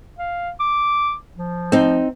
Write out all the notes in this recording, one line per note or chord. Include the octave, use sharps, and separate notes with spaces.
F5
D6
F3
C4 D#4